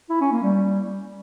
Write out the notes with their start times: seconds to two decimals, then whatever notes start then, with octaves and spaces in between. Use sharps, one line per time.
0.10 E4
0.21 C#4
0.32 A#3
0.43 G3